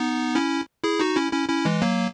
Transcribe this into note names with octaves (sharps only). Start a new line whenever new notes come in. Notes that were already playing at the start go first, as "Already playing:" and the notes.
Already playing: B3 D#4
C#4 E4
E4 G#4
D#4 F#4
C#4 E4
C#4 E4
C#4 E4
E3 G#3
F#3 A#3